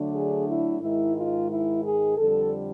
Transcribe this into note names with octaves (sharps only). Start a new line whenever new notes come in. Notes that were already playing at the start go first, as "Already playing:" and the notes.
Already playing: D3 F#3 A3 D4
G#4
E4
G#2 D#3 G#3 E4
F4
E4
G#4
F2 D3 G3 A4